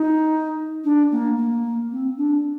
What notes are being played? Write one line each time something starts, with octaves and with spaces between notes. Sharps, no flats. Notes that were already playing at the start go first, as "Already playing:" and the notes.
Already playing: D#4
D4
A#3
A#3
C4
D4